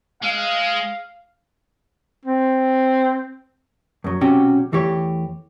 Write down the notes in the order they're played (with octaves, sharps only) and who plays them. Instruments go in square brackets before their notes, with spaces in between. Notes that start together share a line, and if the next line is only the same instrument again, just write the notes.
[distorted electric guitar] G#3 [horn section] F5
[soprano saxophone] C4
[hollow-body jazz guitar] F#2 F#3
B1 C3 C#4 F#4 G4 G5
E2 E3 A3 G4 C#5